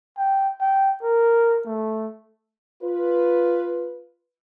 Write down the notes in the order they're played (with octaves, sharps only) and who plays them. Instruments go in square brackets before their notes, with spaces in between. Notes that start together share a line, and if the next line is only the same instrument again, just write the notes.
[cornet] G5
G5
A#4
A3
[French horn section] F4 B4